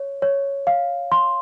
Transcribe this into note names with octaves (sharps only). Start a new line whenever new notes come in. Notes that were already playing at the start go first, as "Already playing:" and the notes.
Already playing: C#5
C#5
F5
C6